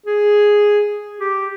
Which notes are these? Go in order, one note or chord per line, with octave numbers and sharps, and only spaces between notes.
G#4
G4